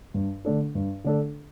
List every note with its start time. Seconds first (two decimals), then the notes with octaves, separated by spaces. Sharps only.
0.14 G2
0.45 D3 A3 D4 A4
0.75 G2
1.04 D3 A3 D4 A4